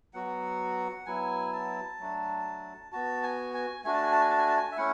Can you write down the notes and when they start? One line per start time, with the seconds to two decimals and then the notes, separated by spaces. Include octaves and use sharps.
0.14 F#3 B3 F#4 F#5
1.06 F#3 B3 E4 G#5
1.53 A5
2.00 F#3 A3 D4
2.92 B3 F#4 A5
3.23 G#5
3.54 G#5
3.84 A3 D4 F#4 G#5
3.94 A5
4.03 G#5
4.12 A5
4.21 G#5
4.30 A5
4.38 G#5
4.48 A5
4.57 G#5
4.72 E5
4.77 A3 C#4 E4 F#5